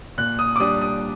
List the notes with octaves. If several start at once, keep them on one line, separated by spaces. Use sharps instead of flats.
A#2 F#6
D#6
D6
G3 D4 D#6
D#6